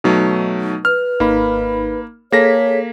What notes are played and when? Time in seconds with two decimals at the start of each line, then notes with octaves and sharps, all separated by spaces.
0.04 B2 F#3 A3 D#4
0.85 B4 F6
1.20 G#1 A#3 D#4 B5
2.32 A#3 G#4 A4 C#5 A#6 B6